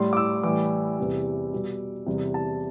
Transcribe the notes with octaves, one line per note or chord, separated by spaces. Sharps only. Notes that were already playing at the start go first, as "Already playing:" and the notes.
Already playing: A2 G3 C6
D6
E6
A2 E3 G3 D6
E2 C3 G3
B2 G3
E2 C3 G3
A5